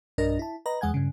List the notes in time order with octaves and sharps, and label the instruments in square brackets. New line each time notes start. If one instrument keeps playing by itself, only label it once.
[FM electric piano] B1 G2 D4 A#4 D#5 A#6
E4 A5
B4 D#5 A#5
E2 G#3 F#5 G#5 G#6
G2 C#3